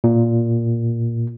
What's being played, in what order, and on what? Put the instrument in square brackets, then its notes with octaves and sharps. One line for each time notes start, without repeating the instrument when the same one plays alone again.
[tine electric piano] A#2